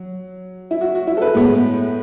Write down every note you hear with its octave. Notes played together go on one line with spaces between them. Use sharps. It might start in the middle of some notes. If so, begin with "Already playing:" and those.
Already playing: F#3
E4
F#4
F#4
E4
A4
B4
A2 G#3 B3